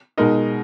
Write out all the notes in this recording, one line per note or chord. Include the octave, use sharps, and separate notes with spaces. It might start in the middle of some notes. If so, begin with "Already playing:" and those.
B2 G#3 D#4 A#4 D#5